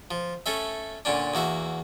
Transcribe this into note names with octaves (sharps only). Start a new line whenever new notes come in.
F3
A3 C#4 A4 E5
A#2 D3 C#4 D4
E2 A#3 F#4 E5